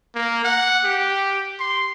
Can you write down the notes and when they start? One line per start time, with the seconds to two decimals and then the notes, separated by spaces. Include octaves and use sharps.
0.15 A#3
0.45 F#5
0.84 G4
1.60 C6